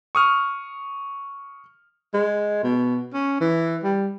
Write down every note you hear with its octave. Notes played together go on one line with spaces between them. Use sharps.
C#6 D#6 F6
G#3
B2
C#4
E3
G3